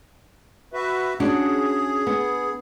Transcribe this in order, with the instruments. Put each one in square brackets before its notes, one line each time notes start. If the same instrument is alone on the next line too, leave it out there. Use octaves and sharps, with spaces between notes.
[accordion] F#4 B4 E5
[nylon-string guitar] C#4 D4 F#4 [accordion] G#4
[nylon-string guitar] B3